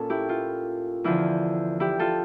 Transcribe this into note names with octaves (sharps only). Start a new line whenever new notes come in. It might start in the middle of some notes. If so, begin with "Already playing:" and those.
Already playing: A#2 C#4 A4
E4 G4
F4
E2 D3 F3 E4
E4 G4
F4 A4